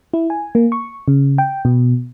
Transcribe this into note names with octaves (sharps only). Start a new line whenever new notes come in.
E4
G#5
A#3
C#6
C#3
G5
B2